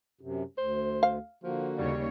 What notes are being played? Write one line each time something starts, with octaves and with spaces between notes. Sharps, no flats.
F#2 C3
D2 C5
F5
D3 F3 A#3 F#4
D#2 C#3 G3 C#5